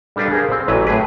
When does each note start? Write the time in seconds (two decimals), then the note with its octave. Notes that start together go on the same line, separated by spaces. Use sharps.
0.16 G3 D4 A4 B4 D5 F5
0.31 G#4 A#4 C5 F5
0.52 C4
0.68 A1 E3 F#3 B4
0.87 A2 G#4 B4